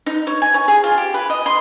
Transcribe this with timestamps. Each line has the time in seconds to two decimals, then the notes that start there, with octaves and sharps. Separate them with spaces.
0.06 D#4
0.27 C#5
0.42 G#5
0.54 C#5
0.68 G#4
0.84 F4
0.98 G4
1.14 B4
1.30 D#5
1.46 C6